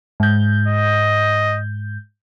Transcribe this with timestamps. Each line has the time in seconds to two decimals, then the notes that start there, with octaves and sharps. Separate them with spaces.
0.20 G#2 G6
0.67 D#5